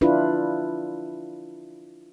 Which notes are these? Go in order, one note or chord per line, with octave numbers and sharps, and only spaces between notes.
D4 E4 F4 B4